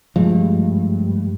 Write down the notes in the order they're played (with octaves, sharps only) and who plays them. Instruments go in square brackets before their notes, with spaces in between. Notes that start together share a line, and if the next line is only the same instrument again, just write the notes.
[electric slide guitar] G2 [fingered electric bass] F3 G#3 A3